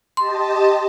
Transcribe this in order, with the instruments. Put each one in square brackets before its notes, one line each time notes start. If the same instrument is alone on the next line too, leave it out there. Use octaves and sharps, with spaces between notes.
[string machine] G4 D#5 A5 [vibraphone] C6